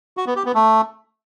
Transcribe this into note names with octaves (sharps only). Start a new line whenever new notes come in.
F#4
B3
G4
B3
A3